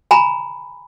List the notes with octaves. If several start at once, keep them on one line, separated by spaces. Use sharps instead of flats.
G#5 A#5 B5